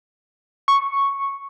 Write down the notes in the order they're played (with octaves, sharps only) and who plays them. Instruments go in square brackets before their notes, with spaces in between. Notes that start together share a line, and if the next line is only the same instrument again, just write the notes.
[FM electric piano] C#6